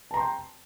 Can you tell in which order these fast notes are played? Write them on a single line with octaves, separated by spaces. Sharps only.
A5 A#5 C6 G5